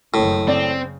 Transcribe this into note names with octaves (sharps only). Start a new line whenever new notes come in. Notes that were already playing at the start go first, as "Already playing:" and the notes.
F#1 A2 D#3
C#3 C4 D5